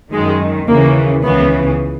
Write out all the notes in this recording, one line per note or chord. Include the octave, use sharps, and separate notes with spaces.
F#2 D#3 G#3
D#2 C#3 E3 A#3
C#2 C#3 E3 B3